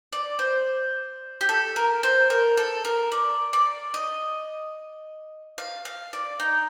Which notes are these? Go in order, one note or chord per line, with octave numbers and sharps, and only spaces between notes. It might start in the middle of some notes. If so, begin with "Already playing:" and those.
D5
C5
G4
A4
A#4
C5
A#4
A4
A#4
D5
D5
D#5
F5
F5
D5
D#4